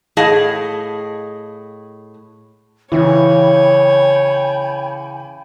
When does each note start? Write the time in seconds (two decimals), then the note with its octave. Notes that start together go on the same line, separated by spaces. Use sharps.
0.17 A2 G#4 D#5 F5 A5
2.92 C#3 E3 C#5 G5 G#5 B5